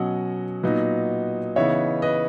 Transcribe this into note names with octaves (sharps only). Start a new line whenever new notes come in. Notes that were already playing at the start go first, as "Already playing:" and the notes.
Already playing: B2 F#3 C#4 D#5 F#5
A#2 F#3 B3 D#4
C#3 E3 B3 D#4 C#5 E5
B4 D#5